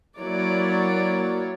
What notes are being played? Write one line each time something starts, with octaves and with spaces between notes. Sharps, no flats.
F#3 A#3 E4 A#4 C#5 D5